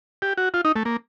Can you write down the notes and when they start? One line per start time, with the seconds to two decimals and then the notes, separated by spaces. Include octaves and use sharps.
0.22 G4
0.38 F#4
0.54 F4
0.65 D#4
0.76 A3
0.85 A#3